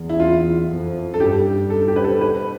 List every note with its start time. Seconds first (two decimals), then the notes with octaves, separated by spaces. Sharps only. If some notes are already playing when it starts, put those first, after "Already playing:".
Already playing: E2
0.09 E4
0.20 F4
0.69 F2
1.14 A4
1.20 G2 G4
1.70 A4
1.88 G4
1.96 B4
2.04 A4
2.21 B4